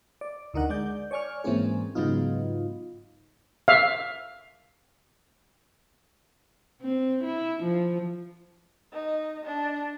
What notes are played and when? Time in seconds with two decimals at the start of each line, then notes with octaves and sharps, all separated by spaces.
0.21 D5
0.54 D2 D3 D#4 A#4 F#5
0.70 G#3 D5 G6
1.11 C#5 D5 G#5 C#6 F6
1.44 G#2 E3 A#3 C4 C#4 G#4
1.95 G#2 C#3 F#3 B3 D#4 F4
3.68 E5 F5
6.82 C4
7.24 E4
7.64 F3
8.92 D#4
9.45 D4